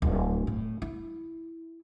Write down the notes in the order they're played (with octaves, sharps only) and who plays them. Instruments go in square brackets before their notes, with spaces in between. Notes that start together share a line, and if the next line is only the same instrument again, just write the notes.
[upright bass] D1
A2
E4